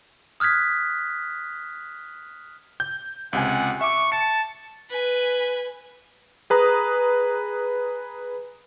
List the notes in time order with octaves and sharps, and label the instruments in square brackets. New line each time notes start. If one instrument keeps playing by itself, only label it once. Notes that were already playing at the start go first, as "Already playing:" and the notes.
[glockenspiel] D#6 F6 F#6 G#6 B6
[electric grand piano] G6
[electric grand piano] C#2 C3 G#5 [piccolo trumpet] F#5
[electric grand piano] E5 D6 [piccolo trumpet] C#6
[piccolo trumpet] A5 [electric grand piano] C#7
[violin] B4 G#5
[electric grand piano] G#4 B4 A#5 D#6